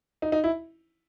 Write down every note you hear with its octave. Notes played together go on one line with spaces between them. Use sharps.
D#4
D#4
E4